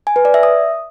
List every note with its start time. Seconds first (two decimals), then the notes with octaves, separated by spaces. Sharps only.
0.07 G#5
0.16 B4
0.25 D5
0.34 E5
0.43 D#6